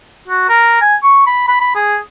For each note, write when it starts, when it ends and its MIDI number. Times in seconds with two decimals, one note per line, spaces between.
0.28 0.44 66
0.49 0.77 70
0.81 0.95 80
1.03 1.25 85
1.27 1.44 83
1.48 1.60 83
1.61 1.74 83
1.75 1.97 68